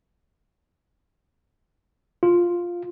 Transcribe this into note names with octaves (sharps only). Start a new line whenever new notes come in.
F4